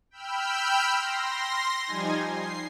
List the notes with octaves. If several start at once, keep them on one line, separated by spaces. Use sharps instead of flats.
G5 B5 E6 F6 G6
C6 A#6
F3 G3 D#4 G#5 G#6
C7